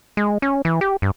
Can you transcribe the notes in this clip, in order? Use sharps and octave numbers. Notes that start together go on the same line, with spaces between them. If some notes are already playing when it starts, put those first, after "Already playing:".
G#3
C#4
E3
G4
G2